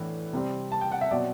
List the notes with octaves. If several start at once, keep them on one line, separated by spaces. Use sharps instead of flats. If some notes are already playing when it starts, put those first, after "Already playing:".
Already playing: A2 E3 B3 D4
C3 G3 C4
A5
G5
F#5
E5
B2 F#3 C4 D5